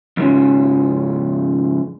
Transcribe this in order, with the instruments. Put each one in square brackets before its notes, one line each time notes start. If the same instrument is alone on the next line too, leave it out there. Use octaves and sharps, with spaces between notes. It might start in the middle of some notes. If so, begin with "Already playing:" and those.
[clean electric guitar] F2 G#2 C#3 F3 C#4